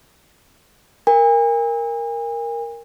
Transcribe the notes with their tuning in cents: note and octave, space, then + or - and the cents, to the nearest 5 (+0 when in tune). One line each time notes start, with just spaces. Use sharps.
A#4 +0 G#5 -40